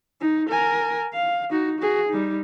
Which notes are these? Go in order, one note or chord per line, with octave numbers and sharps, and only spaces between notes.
D#4
A#4 G#5
F5
D#4 F#4
F#4 G#4
G3 D#4